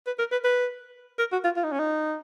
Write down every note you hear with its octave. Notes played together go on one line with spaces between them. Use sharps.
B4
A#4
B4
B4
A#4
F#4
F4
F4
D#4
C#4
D#4